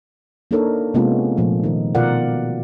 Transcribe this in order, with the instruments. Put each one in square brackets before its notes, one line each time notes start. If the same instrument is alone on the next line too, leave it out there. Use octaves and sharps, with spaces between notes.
[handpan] A#3 D4 D#4 A4 A#4 C#5
C3 G#3 A#3 B3 C#4 F4
A#2 F3 A3
D#3 D#4
B2 F4 A#4 D5 F5 F#5